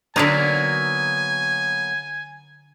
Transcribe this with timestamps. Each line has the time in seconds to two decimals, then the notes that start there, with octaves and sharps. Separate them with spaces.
0.16 D3 F#3 A#3 B3 D4 D#4 G#5